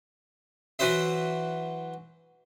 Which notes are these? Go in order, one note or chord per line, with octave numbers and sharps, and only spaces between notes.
E3 F#3 F#4 C5 E5